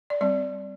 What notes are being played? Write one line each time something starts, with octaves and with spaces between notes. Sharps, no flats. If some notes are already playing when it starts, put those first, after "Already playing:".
D5
G3 C4 D5